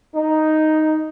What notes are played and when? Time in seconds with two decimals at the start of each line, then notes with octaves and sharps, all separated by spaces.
0.15 D#4